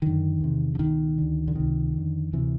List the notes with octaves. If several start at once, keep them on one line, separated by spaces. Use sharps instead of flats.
F#2 D3 D#3
E2 C3
D3
C#2 B2 D#3
D2 D3
D3
C#2 C3 D#3
F2 D3
D2 C3 E3